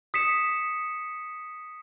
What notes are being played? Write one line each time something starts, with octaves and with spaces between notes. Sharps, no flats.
D#6 B6 C#7 E7